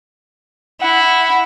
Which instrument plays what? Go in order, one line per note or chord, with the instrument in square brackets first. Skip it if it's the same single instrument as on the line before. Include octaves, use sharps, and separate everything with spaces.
[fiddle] E4 [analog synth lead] F#5